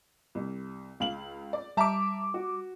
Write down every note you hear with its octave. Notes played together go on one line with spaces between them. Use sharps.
C2
C#2 F5 F#7
D5
G3 E5 A5 A#5 D6
F#4